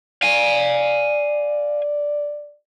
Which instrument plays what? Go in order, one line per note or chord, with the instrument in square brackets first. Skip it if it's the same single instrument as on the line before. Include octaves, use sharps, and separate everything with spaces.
[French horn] D5 [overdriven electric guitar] F5 G#5